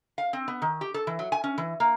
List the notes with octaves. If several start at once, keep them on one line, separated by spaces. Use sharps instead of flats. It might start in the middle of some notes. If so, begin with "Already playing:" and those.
F5
C4
B3
D#3
G4
A4
E3
F#3
G#5
C#4
E3
A#3